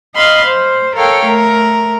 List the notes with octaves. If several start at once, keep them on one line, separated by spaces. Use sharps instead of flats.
D#5 F5 B5 C6
C5
A4 A#4 C#5 F5 G5
A3 A#4